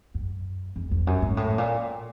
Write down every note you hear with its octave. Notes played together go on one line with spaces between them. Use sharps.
F#2
F2
F2
F#2
G#2
A2
A#2